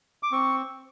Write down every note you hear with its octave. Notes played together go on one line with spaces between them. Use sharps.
D6
C4 C#6